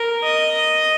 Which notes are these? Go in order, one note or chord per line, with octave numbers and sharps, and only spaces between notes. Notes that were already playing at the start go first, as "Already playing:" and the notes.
Already playing: A#4
D#5